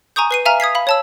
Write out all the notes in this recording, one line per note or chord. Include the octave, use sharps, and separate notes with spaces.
G#5 A#5 C#6 D#6 G6
B4 C7 D#7
E5 F5 G#5 A#5 F6
D#6 G#6 B6 C7
F5 B5
C#5 A5 E6